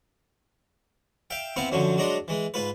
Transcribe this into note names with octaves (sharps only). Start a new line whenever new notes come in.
E5 F5 G5
B3 C4 E4 F5
F#2 D3 F3 F#3
F#3 G#3 D4 A#5 C6
E3 G#3
G#2 F4 B4